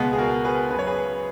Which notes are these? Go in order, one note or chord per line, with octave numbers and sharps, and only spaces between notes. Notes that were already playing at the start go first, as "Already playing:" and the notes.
Already playing: C#2 B2 G#3 B3
G#4
F#4 A#4
G#4 B4
F#2 C#3 B4
C#5
G#4 B4